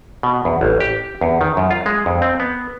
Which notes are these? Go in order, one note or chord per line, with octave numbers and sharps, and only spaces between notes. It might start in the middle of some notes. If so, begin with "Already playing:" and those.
B2
E2
A1
G4
E2
D#3
F#2
F4
G#3
F2
C4
B3